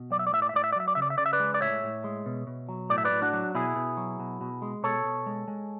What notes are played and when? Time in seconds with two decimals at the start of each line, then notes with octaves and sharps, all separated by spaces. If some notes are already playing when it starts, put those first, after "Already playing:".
Already playing: B2
0.11 F#3 D5
0.19 E5
0.27 D5
0.32 A2 E5
0.42 D5
0.49 E5
0.54 A2 D5
0.64 E5
0.72 D5
0.76 F#3 E5
0.88 D5
0.95 C#3 E5
1.02 D5
1.10 E5
1.18 C#3 D5
1.26 E5
1.33 B4 D5
1.40 G#3
1.54 D5
1.61 A2 C#5 E5
1.83 A2
2.04 G#3
2.26 B2
2.47 B2
2.69 F#3
2.90 A2 D5
2.98 E5
3.05 B4 D5
3.11 A2
3.22 D4 F#4
3.33 F#3
3.55 B2 E4 G#4
3.76 B2
3.97 F#3
4.20 B2
4.41 B2
4.62 G#3
4.83 B2 A4 C#5
5.05 B2
5.26 G#3
5.48 G#3